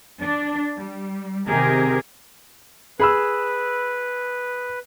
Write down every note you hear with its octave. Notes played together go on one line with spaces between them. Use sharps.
D4
G3
C3 D#3 C4 G4 G#4 A#4
G#4 B4 B5 E6